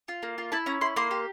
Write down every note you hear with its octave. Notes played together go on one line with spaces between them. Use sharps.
F4
A#3
F4
E4 A5
C#4 A#5
E4 C6
A#3 C6
G4